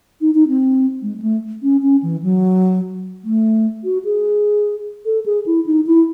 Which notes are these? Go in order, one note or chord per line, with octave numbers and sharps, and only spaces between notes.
D#4
D#4
C4
G#3
G#3
A3
C#4
C#4
E3
F#3
A3
F#4
G#4
A4
G#4
E4
D#4
E4